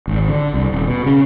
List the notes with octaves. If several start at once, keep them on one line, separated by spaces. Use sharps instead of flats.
G#1
D3
C2
D#1
B2
C#3